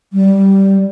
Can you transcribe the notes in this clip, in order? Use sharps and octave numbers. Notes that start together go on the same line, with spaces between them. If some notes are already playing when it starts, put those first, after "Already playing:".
G3